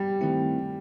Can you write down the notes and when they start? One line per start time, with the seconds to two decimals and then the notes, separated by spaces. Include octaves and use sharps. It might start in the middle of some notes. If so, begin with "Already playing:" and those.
Already playing: G3
0.21 D#3 A3 C4 E4